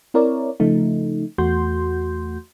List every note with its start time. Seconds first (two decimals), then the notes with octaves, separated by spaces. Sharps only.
0.14 C4 E4 A#4 C#5 D5
0.60 C#3 F3 A3 D#4
1.38 E2 A3 F#4 C6 G6